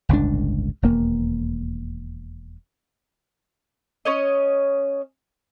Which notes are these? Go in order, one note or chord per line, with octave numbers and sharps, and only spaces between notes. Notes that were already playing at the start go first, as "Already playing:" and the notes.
G1 C#2 A2 D4
E1 D#2 A#3
C#4 C#5 D#5